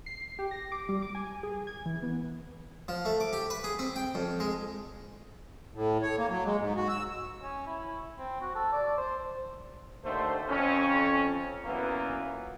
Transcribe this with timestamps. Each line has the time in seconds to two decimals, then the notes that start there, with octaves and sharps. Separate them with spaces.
0.06 C7
0.39 G4
0.51 A#6
0.72 D6
0.89 G3
1.02 D6
1.15 G#5
1.43 G#4
1.67 G#6
1.86 E3
2.03 B3
2.88 F3
3.05 A3
3.20 D6
3.33 G4
3.50 B4
3.64 G#4
3.79 C4
3.96 G5
4.15 F2
4.40 G#3
5.75 A2
6.02 C#5
6.18 A#3
6.30 F#3
6.45 G#3
6.60 G#2
6.77 F#4
6.89 E6
7.43 C#4
7.67 E4
8.18 C4
8.41 F#4
8.55 A4
8.72 D5
8.98 C5
10.05 D#2 D3 A3 C5
10.49 F2 C#4
11.65 F#2 A#2 E3 A#3 B3